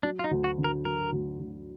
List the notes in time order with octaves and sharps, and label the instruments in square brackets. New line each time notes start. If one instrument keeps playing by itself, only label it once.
[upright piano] F#3 [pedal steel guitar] D4
[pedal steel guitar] F4
D#4
[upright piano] D2
[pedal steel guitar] F#4
[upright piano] D3
[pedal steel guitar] A#4
[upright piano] F#3 [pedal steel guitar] A#4
[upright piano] D2
D2